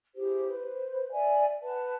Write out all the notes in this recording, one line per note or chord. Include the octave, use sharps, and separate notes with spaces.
E4 G4 G#4 C5
B4 C5
D5 E5 G#5
B4 F#5 A5